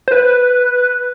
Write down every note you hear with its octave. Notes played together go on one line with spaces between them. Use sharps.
C5
B4